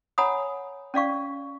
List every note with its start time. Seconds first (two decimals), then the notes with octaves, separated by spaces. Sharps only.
0.18 C#5 F#5 G#5 A#5 B5 D#6
0.94 C#4 D5 F5 C#6